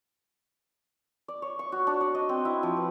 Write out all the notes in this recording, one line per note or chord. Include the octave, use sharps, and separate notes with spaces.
D5
C#5
C#6
F#4
D4
D5
D#5
C4
E4
F3
B4